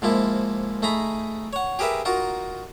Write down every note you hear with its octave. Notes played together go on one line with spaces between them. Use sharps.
G#2 F3 A#3 E4
A3 D#4 G#4 A#5 B5
C#5 F#5
G4 G#4 A#4 B4 E5
D#4 F4 F#4 A#4